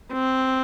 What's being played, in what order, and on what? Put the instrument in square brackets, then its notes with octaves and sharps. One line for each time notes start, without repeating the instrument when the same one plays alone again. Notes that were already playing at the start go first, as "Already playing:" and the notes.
[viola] C4